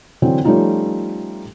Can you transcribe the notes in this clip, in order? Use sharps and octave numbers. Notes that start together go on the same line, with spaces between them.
D3 E3 F#3 C4
F3 G3 A3 C#4 D#4 F4